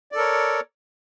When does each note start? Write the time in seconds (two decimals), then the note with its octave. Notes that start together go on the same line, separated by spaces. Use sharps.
0.12 D5
0.15 A4
0.17 A#4
0.20 C#5